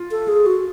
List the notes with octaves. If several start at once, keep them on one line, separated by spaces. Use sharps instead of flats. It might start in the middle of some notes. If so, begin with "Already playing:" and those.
Already playing: F4
A4
G#4
F#4